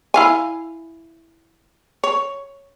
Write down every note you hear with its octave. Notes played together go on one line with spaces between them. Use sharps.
E4 F5 G#5
C#5